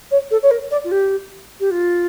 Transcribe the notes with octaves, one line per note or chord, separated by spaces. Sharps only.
C#5
A4
C#5
A#4
D5
F4
G4
G4
F4